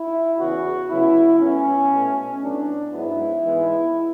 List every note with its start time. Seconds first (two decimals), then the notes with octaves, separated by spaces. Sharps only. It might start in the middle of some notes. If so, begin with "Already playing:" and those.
Already playing: E4
0.37 E2 C#3 E3 F#4
0.88 C#3 F#3 B3 E4
1.39 A2 F#3 B3 C#4
1.91 B2 A3
2.41 A2 F#3 B3 D4
2.93 G#2 F#3 B3 E4
3.43 G#2 E3 G#3 B3